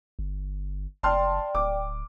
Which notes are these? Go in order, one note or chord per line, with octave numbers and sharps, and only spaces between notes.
G1
F#1 D5 G5 A5 C6 F6
D1 D6